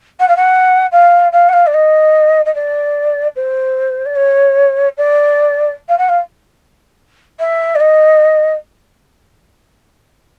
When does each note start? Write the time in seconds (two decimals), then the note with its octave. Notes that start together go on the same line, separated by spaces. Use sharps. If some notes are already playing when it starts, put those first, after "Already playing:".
0.20 F#5
0.28 F5
0.36 F#5
0.92 F5
1.32 F5
1.49 F#5
1.53 F5
1.67 D5
1.74 D#5
2.45 D#5
2.55 D5
3.36 C5
4.06 D5
4.16 C#5
4.97 D5
5.89 F5
5.98 F#5
6.09 F5
7.40 E5
7.75 D5
7.80 D#5